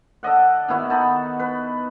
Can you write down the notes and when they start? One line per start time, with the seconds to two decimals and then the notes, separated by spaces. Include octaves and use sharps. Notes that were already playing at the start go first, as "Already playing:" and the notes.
0.23 A4 D5 D#5 F#5
0.68 D#3 B3 E4 F#4
0.90 D#4 A5 B5
1.39 B4